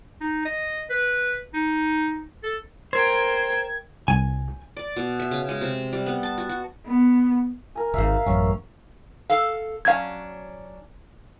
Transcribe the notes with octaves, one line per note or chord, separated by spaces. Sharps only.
D#4
D#5
B4
D#4
A4
A#4 C5 G5 G#6
C2 G#5
D5
B2
E5
C#3
G#3
C3
G3
B3
A5
F#4
F#4
B3
A#4 G#5
D1 G#1 E5 F5
A1 F#2 C#4
A4 F5
F#3 C#4 D4 F5 G#6